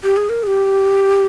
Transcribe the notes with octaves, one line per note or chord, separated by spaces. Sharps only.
G4
G#4
A#4
G#4
G4